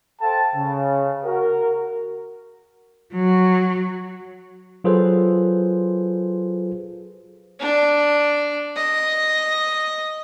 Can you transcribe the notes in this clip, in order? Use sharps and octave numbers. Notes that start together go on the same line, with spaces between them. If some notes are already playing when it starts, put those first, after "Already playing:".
A4 C5 F5 G5 A5
C#3
F#4 A#4
F#3
F#3 F4 G#4 A4 B4 C5
D4
D#5